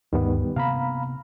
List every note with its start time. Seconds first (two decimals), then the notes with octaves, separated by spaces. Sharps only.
0.13 D2 G2 D#3 G3 B3
0.56 C3 A#3 B3 F5 A#5 B5